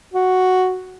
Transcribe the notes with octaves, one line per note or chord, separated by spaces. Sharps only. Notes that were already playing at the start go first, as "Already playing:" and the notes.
F#4